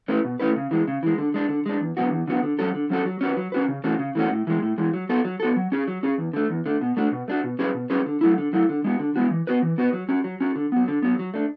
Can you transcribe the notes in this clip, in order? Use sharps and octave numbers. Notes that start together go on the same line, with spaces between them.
A3 C#4 E4 B4
B2
A3 C#4 E4 B4
C#3
E3 G#3
C#3
E3 G#3
D3
G#3 D4
D3
G#3 D4
E2
D3 F#3 B3 F#4
E2
D3 F#3 B3 F#4
D3
F#3 C#4 F#4 A4
D3
F#3 C#4 F#4 A4
F#3
C#4 F#4 B4
F#3
C#4 F#4 B4
C#3
E3 A3 C#4 F#4
C#3
E3 A3 C#4 F#4
A2
E3 G#3
A2
E3 G#3
F#3
B3 F#4 A4
F#3
B3 F#4 A4
F#3
C#4 G#4
F#3
C#4 G#4
E2
D3 A3
E2
D3 A3
B2
A3 D4 F#4
B2
A3 D4 F#4
B2
F#3 C#4 G#4 B4
B2
F#3 C#4 G#4 B4
D3
F#3 A3 E4
D3
F#3 A3 E4
D3
G#3 B3 F#4
D3
G#3 B3 F#4
E3
B3 F#4 B4
E3
B3 F#4 B4
F#3
C#4 F#4
F#3
C#4 F#4
D3
F#3 B3
D3
F#3 B3
F#3
A3 D4